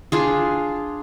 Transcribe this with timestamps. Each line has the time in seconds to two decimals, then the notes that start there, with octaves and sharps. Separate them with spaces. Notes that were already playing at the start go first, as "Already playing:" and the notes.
0.12 D4 F4 G#4